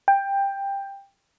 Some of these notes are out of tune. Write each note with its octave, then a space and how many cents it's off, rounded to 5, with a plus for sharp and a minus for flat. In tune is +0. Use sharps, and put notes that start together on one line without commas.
G5 +15